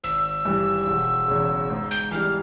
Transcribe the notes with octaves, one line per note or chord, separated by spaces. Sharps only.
G#1 E6
G2 E3 G3
E1
E2 C#3
G#2
G6
E3 G3 F6